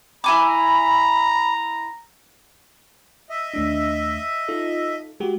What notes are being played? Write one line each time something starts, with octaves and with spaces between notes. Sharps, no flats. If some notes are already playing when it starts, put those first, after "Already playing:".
E4 G#5 A#5 B5 D6
D#5 E5
D#2 A3 D4
D#4 F4 A4
G#3 F#4 G4